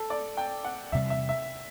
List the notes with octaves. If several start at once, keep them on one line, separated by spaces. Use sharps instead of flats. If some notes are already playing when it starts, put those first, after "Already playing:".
Already playing: A4
D5
G5
F#5
E2 C3 G3 E5
E5
E5